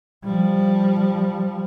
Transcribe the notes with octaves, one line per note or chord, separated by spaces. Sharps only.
F3 G3